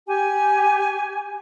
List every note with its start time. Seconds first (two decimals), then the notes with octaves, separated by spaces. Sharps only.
0.07 G4 G#5